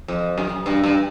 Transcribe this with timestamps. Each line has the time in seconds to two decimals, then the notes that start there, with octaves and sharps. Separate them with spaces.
0.08 F2
0.38 F#2
0.66 G2
0.84 G2